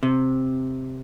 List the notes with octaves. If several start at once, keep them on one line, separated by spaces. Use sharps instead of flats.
C3